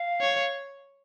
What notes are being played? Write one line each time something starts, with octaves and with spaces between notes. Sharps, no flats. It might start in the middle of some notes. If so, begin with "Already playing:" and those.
Already playing: F5
C#5